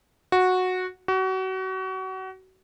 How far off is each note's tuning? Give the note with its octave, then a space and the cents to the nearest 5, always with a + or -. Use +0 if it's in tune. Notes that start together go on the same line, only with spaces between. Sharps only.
F#4 -10
F#4 +30